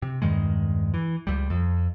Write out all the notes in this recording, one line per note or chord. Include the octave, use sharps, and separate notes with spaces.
C3
E2 G2 D#3 G#3
E3
C#2 G3
F2